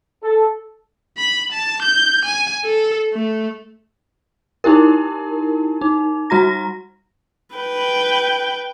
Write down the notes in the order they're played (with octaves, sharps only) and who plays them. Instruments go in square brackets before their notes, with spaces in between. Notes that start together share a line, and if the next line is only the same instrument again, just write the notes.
[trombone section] A4
[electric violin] B5
A5
G6
G#5
A4
A3
[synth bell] D#4 E4 G4 A#4
D#4
G3 F#4 A#5 A#6
[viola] B4 G5